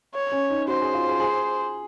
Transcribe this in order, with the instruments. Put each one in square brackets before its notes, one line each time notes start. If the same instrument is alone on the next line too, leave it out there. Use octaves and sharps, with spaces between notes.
[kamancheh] C#5
[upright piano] C#4
D#4
[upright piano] F#4 [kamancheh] C5
[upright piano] G#4
F4
G#4
G#4